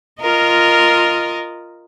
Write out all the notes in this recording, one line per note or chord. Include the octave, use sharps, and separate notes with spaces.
F4 A#4 D#5